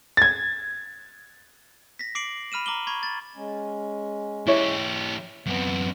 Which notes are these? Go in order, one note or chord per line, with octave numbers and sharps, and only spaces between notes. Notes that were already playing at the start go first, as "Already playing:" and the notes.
G#6 A6
A#6 B6
D6 C7 D7 F#7
B5 F6 D#7 E7
A#5 D6 F#7 G7
B5 C#6 G#6
A6
G#3 C#4
E3 E4 G4 C#5
F#2 B3 C4